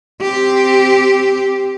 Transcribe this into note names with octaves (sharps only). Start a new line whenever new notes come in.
C4 G4